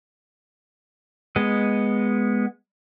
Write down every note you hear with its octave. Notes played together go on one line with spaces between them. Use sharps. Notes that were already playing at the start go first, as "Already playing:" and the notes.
G#3 B3 D#5